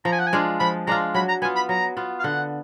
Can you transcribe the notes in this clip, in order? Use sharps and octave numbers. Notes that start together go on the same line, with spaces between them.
F3 A#5
G#5
F#5
G#5
G#3 D4 F4
F3 B5
G#3 D4 F4 A#5
F#3 B5
A#5
B3 F4 G#5
B5
F#3 A#5
B3 F4
F5
D3 F#5